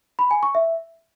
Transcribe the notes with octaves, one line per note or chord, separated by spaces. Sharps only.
B5
G#5
C#6
E5